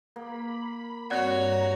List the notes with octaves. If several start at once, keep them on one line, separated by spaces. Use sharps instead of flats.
A#3 B5
G2 C4 F#4 C#5 D5 F#5 A#5